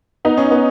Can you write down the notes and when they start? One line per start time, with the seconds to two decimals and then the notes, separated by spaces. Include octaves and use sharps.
0.25 B3 D#4
0.38 C#4
0.51 B3